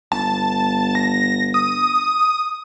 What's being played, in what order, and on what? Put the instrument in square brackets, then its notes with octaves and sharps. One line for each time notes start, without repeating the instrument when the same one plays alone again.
[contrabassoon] G1 [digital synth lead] A5
[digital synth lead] A#6
D#6